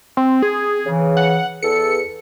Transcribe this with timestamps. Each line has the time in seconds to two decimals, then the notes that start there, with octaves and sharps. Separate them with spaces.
0.17 C4
0.42 G#4
0.86 C#3 E3
1.17 F#5
1.63 E2 A4 C#7